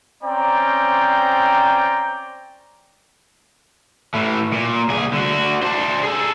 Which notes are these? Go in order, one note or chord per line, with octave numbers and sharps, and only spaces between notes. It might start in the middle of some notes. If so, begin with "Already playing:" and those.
C4 C#4 C5 D5 G5 A#5
A2 E3
A#2
C2 G#4
D3 F#4
D4 C5
G#4 A4